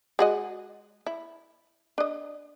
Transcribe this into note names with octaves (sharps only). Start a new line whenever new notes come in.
G#3 F#4 D#5
E4
D4 D#5